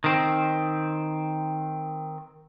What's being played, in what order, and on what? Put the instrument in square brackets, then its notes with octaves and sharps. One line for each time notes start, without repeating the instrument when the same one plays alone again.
[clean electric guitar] D#3 C4